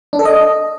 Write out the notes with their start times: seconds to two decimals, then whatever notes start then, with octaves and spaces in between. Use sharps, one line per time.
0.13 D4
0.19 A4
0.25 D#5